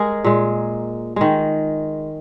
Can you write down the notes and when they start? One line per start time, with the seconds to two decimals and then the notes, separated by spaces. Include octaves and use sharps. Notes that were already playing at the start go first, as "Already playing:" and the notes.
Already playing: G#3 G#4 A#4
0.24 A#2 G#3
1.16 D#3 G#3